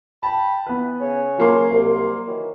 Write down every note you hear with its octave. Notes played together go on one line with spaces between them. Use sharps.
G5 A5 B5
E3 B3 B4
C#3 G#4 C#5
F#3 A#3 C6
C2
D#3 E3 F#3